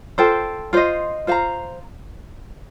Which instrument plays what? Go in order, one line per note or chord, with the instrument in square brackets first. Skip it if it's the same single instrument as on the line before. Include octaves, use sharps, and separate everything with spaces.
[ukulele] F4 A4 C5 G5
F4 C5 D#5
F4 C5 F5 A#5